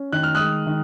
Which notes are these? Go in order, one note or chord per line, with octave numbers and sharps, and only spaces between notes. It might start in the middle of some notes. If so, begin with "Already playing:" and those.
Already playing: C#4
D#3 F#6
F6
G#3 D#6 F#6
D#3